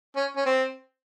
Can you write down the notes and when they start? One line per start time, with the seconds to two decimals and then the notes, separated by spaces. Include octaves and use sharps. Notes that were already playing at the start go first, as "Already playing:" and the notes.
0.16 C#4
0.36 C#4
0.46 C4